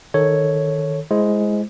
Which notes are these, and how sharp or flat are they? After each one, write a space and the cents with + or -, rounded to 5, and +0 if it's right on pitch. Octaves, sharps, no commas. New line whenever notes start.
D#3 +0 A4 +0 C#5 +0
G#3 +10 E4 +0 C5 +0